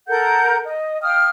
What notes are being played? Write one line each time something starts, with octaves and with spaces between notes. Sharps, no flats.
A4 A#4 F#5 G6
D#5
F5 G5 D#6 F6